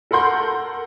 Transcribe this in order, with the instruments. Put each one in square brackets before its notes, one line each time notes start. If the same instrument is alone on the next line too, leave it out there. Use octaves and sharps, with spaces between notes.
[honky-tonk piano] A4 A#4 F#5 C6 G6